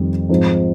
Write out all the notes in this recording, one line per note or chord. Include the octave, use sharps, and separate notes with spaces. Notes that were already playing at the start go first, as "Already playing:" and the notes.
Already playing: F2 D#3 G3
G#2 F3 C4 D#4